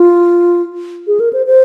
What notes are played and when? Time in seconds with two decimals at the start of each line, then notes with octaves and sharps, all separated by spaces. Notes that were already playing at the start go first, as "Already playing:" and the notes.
Already playing: F4
1.07 G#4
1.20 A#4
1.33 C5
1.47 C5